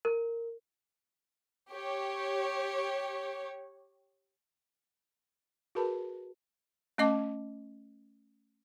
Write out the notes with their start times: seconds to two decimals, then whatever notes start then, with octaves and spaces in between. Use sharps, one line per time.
0.05 A#4
1.71 G4 C#5
5.75 F#4 G#4 A#4 B4 A5 B5
6.98 A3 C#4 D#5 A5 D6